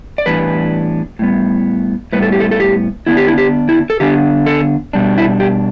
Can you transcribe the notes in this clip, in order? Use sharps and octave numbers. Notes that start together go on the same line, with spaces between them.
D5
A2 E3 G3 B3 D4 B4
A2 G3 B3
A2 G3 B3 B4
A4
G4
A4
A4
G4
D3 B3 D4 E4
G4
E4
G4
E4
A4
D3 B3 D4 G4
A4
B2 G3 D4
E4
G4